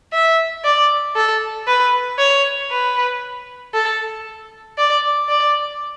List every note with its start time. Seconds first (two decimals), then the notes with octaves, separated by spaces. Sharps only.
0.13 E5
0.64 D5
1.16 A4
1.68 B4
2.19 C#5
2.71 B4
3.74 A4
4.78 D5
5.29 D5